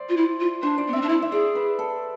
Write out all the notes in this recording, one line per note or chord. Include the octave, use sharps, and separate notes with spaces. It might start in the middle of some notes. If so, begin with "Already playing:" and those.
Already playing: C5 D5 E5
F4
E4
F4
D4 C5
D5
B3
C4 E5
D4
E4 E5
E5
G#4 D5
B4
A4